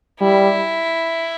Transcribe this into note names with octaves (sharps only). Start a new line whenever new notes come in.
G3 E4